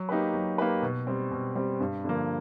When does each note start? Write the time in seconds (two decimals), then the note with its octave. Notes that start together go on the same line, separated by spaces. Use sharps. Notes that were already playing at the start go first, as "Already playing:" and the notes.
Already playing: F#3
0.09 A#3 D#4 G4 B4
0.34 F#3
0.58 A#3 D#4 G4 B4
0.82 B2
1.07 G3 C4
1.31 B2
1.55 G3 C4
1.80 G2
2.04 D3 F3 A#3